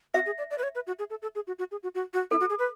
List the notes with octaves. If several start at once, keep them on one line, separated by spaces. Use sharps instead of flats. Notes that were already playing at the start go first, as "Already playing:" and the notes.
F#4 E5
G#4
D5
D5
B4
C#5
B4
F#4
G#4
A4
A4
G#4
F#4
F#4
G#4
F#4
F#4
F#4
E4 A4
F#4
G#4
B4